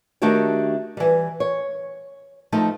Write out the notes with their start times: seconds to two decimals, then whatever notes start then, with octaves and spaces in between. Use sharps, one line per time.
0.22 D#3 A3 D4 F#4 G4 C#5
0.97 E3 G3
1.40 C#5
2.52 F3 A3 D#4